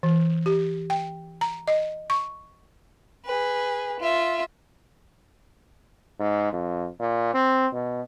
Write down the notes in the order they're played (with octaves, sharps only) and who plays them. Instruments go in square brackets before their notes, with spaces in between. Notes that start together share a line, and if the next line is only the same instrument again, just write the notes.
[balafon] E3
G4
G5
A#5
D#5
C#6
[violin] G#4 B4
F4 E5
[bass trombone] G#2
F2
A#2
C4
B2